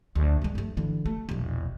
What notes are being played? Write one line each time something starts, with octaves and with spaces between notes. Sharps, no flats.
D2
F#2 G#3
G2 A3
D3 E3
A3
E1 A#1